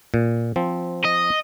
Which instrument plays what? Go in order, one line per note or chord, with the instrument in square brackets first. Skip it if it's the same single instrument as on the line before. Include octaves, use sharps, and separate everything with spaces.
[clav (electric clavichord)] A#2
F3 C4
[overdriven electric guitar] D#5